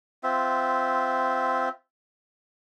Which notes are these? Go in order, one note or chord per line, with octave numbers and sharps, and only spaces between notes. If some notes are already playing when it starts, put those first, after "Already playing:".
C4 F4 E5